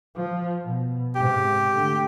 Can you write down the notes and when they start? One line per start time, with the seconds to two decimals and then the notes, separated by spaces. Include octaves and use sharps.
0.15 F3
0.63 B2
1.15 G#2 C3 G4
1.72 D3 A3